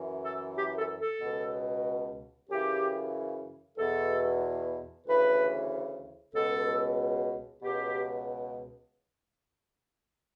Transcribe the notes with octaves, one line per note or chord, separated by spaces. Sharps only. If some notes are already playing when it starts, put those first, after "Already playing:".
Already playing: F#2 E3
A4
G4
A4
A4
C#2 B2
F#2 C#3 E3 G4
E2 B2 A4
D2 C#3 E3 B4
C#2 B2 A4
C#2 B2 G4